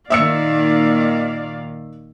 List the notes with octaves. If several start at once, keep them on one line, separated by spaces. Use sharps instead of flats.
A#2 D#3 D5 E5 F5 E6 C#7